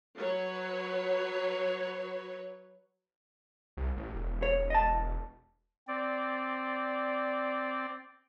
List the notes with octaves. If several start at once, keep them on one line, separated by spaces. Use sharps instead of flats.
F#3 B4 C#5
C2
A1
E1
C#5
D#5 A5
C4 D5